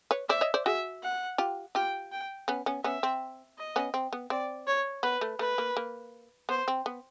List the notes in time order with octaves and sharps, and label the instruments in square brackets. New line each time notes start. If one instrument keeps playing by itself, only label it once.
[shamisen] B4 C#5
[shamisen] C5 D5 [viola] E5
[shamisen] C#5 D#5
C5 D5
[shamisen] F#4 G#4 [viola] E5
[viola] F#5
[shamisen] F4 G4
[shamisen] F4 G4 [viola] G5
[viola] G5
[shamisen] B3 C#4
B3 C#4
[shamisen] B3 C#4 [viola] E5
[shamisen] C4
[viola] D#5
[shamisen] B3 C#4
C4
B3
[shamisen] C4 [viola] D5
[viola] C#5
[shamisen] B3 [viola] B4
[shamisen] A3
[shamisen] A3 [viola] B4
[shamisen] A#3
A#3
[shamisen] B3 [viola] C5
[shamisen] C4
B3